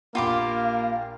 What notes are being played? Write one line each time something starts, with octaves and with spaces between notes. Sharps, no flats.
A#1 A#3 F4 G4 F5 B5 C6 D6